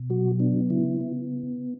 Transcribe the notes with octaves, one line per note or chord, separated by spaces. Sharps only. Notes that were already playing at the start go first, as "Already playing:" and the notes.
Already playing: B2
F#3 F#4
B3 D4
C#3 E4
B3